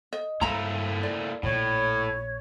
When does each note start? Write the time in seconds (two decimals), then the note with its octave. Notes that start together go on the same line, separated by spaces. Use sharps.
0.13 D#5
0.41 G2 A3 A#3 E4 A#5 B5
1.03 D5
1.43 A#1 A2 C#5